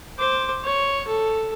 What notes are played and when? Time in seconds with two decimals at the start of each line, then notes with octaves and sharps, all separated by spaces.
0.18 C5 D6
0.64 C#5
1.07 A4